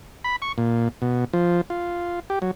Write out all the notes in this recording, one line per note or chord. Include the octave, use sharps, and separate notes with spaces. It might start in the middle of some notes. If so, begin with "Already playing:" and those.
B5
C#6
A#2
B2
F3
F4
G4
F#3